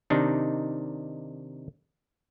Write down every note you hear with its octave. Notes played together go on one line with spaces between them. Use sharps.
C3 D#3 D4 D#4